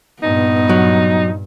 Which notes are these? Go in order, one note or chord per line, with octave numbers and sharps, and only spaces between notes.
G2 A#2 B3 D#4
F#3